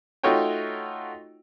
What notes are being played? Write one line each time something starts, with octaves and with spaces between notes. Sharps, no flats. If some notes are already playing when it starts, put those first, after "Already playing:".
A3 D#4 F4 F#4 C#5 G5